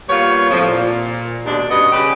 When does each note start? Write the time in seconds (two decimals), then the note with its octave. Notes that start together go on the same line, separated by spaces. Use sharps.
0.09 G3 A#3 B3 F4 C#5
0.50 F2 A2 C#3 F3
0.68 A#2
1.45 D#2 B2 G#3 D4
1.70 G2 B2 B3 C#4 B4 D#5
1.92 C#3 G4 B4